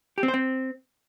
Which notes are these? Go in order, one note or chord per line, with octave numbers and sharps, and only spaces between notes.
G4
C4
C5
C4